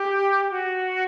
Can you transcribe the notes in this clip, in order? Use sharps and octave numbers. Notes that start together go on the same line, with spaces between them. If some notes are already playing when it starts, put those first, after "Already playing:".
Already playing: G4
F#4